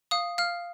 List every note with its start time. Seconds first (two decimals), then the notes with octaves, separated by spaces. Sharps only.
0.11 F5 D#6
0.38 F5 F6